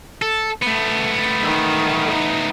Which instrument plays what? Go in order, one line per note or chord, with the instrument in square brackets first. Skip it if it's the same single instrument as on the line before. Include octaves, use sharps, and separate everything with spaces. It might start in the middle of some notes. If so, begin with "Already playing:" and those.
[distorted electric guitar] A4
A3 B3
[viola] D#3
D#4